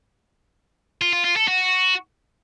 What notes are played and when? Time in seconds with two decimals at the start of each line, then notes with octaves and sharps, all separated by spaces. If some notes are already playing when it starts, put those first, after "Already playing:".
1.02 F4
1.13 F4
1.25 F4
1.36 A4
1.48 F#4